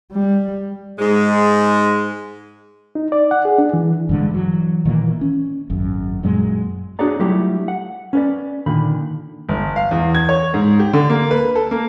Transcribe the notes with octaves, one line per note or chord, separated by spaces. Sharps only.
G3
G#2 G#3
D#4
D5
F#5
G#4
D4
E3
G2 D3 G#3
E3 F#3
A#2 D#3 E3 A#3
C#4
G#1 F#2
F#2 A#2 F#3 G#3
D4 F#4 G#4 C#5 D5 A#5
F#3 G3 A3 E4 F4 G4
F#5
C#4 B4 D5
A#2 D3 D#3 B5
G1
F5
E2
G#6
C#5
G#2
G4
D3
A#3
B4
A4
A#3